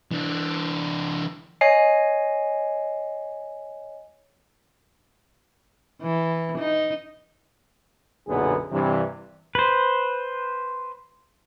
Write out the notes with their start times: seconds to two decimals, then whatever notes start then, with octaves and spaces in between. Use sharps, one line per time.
0.12 E3 D4
1.61 C#5 D#5 G#5 C7
6.02 E3
6.59 D#4
8.28 B1 F#2 A#2 D3 B3 G#4
8.71 G2 C3 E3
9.55 B4 C5